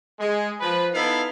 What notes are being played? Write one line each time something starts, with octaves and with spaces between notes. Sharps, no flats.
G#3
F3 B4
B3 D#4 E4 A4 F5